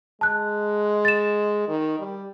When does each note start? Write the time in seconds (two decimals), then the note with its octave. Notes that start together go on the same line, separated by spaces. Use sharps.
0.21 G#3 A5 F#6
1.05 A6 E7
1.68 D#3
2.00 G3